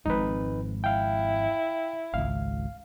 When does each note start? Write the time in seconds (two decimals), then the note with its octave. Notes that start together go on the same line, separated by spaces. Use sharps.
0.06 G#1 F2 G#2 D#4 B4
0.84 E4 F5 G5
2.14 G#1 C#2 F5